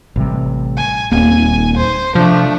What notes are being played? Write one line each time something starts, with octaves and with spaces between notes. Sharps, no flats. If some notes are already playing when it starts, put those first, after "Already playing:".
A1 C3 G3
G#5
D#1 A#3 C4 G#5
C5
C3 F3 A3 D4